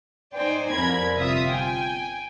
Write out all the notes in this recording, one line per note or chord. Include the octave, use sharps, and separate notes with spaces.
D#4 C5 D5 G5 G#5
C2 F2 A#4 B5 G#6
G1 C3 F4 E5 D#6
G5 G#5